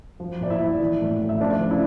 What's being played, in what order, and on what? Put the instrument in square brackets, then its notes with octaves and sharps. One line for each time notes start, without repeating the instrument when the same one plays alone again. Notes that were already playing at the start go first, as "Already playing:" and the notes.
[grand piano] F3
A#2 D5
E4 E5
F3
E3
A2
A2
E5
F3 D4 D5
C#3
E4